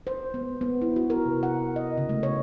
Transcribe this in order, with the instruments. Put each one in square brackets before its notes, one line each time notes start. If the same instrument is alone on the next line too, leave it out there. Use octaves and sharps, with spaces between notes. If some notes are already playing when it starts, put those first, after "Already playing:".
[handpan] C5
B3
B3
E4
F#4
A#4
C3
F#5
D#5
C#3
A3
C#5